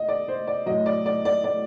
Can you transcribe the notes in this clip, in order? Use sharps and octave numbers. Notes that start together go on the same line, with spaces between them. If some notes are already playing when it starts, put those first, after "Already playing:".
Already playing: D#5
D5
C5
D5
A2 F#3 D#5
D5
D5
D5
D5